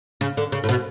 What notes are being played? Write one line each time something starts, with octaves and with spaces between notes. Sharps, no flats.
C#3
D3
C#3
A2
B2